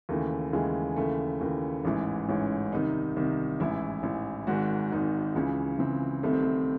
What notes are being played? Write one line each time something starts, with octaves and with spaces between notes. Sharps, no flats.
D#2 C#3 E3 A3
D#2 C#3 E3 G#3
D#2 C#3 E3 A3
D#2 C#3 E3
A1 G#2 E3
A1 G#2 E3 C#4
C2 C3 D#3 D#4
C2 C3 D#3
A1 G#2 E3 E4
A1 G#2 E3
G#1 G#2 D#3 F#4
G#1 G#2 D#3 D#4
C#2 C#3 E3
C#2 C#3 E3 C4
C2 C3 D#3 A3
C4
A3